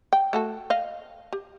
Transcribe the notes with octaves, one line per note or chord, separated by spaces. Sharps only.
G5
A3 F#4 A4
D#5 F5
G4